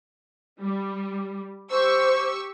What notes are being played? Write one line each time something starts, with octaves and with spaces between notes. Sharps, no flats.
G3
G4 C5 C#6 E6